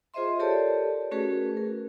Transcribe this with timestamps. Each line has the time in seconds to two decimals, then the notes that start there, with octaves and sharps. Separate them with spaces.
0.14 F4 G#4 C5 D#5 E5 C6
0.40 G4 A4 A#4 C#5 D5 A5
1.11 A3 C#4 F#4 G#4 A#4 B4
1.57 A#4